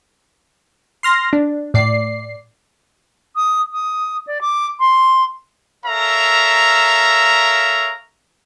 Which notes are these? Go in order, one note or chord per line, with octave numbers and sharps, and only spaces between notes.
C6 F6 A#6
D4
A2 D5 C7
D#6
D#6
D5
D6
C6
A4 A#4 C#5 E5 F5 A#5